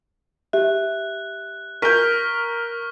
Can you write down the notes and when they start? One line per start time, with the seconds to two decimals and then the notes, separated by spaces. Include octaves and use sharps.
0.53 G4 E5 F#6
1.82 A#4 C#6 F6 G6 B6